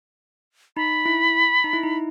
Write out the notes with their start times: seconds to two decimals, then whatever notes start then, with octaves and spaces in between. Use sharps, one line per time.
0.76 D#4 B5
1.06 E4
1.64 D#4
1.73 E4
1.83 D#4